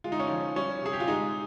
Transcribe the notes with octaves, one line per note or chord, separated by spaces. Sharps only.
G#3 F4
D#4
C#4
F3 D#4
G3 C#4
C3 G#4
G4
F4
G#3 D#4